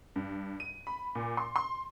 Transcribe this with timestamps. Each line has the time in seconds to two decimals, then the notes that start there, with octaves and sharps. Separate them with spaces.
0.16 G2
0.60 D#7
0.87 B5
1.15 A#2
1.37 C6
1.56 C6